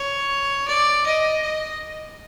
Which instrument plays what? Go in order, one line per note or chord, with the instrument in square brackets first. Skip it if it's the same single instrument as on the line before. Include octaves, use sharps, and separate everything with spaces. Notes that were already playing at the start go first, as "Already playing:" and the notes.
Already playing: [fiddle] C#5
D5
D#5
D#5